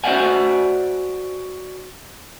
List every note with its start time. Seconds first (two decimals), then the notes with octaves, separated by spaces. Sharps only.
0.04 F#4 C5 D5 E5 F#5 G#5